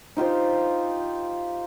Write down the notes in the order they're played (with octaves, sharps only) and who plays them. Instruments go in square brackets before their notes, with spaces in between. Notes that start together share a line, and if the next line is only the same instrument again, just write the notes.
[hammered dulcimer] D#4 F4 G4 C5